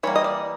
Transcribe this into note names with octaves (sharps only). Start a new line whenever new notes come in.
E3 G3 A#3 C#5
D#5
D5